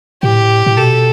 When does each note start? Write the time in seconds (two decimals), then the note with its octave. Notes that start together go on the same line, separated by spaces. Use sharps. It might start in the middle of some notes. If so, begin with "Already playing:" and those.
0.23 A2 G4
0.66 A2
0.77 B2 A4